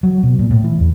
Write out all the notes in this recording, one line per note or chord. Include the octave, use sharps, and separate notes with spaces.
F#3
B2
A#2
A2
E3
E2